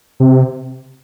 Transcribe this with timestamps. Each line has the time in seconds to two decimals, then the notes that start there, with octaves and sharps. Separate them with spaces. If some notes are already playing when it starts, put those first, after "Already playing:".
0.20 C3